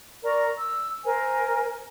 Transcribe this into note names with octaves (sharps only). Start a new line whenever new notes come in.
A#4 D5 A#5 C#6
E6
A#4 C5 G#5